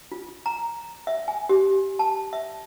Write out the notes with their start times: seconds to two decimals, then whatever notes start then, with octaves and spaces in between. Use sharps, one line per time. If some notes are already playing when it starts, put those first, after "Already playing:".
0.12 F4
0.46 A#5
1.07 E5
1.28 G#5
1.49 G4
1.99 A5
2.33 E5